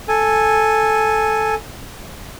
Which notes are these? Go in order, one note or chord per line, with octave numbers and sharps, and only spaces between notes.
A4 G#5